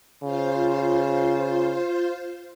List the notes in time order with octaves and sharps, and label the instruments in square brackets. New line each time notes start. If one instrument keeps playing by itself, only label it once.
[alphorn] C#3 [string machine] F4 C5